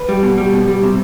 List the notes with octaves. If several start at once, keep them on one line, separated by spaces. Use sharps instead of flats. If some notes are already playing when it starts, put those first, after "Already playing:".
Already playing: B4
G3
B2
G3
B2
G3
C3